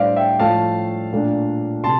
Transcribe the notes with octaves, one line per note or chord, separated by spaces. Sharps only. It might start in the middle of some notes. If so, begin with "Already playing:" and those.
Already playing: A2 G3 D4 C5 D5 E5 F5
E5 G5
A2 F3 A3 F5 A5
A#2 A3 D4
C3 A5 C6